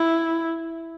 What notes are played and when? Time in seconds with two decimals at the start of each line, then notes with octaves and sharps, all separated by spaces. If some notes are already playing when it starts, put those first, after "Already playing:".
Already playing: E4